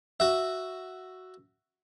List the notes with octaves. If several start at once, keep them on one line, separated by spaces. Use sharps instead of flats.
F#4 E5